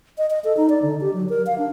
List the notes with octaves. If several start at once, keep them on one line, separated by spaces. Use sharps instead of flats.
D#5
D#5
A4
D#4
D5
D3
G4
F#3
A#4
F5
D4